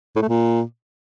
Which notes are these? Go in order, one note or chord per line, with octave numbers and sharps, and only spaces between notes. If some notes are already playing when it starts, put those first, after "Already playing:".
A2
A3
A#2